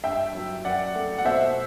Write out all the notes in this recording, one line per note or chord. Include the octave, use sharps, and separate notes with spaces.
G2 E5 G5
F#3
F#2 D5 F#5
A3
F#5
B2 C5 E5